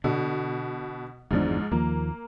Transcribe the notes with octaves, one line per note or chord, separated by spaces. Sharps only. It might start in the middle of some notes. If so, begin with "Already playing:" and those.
B2 D3
G1 E2 G#2 F3 D4
D#2 F3 A#3